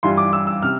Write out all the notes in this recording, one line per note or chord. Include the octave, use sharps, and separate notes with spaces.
G2 E3 G3 D4 F4 C6
D6
E6
E6
C3 F6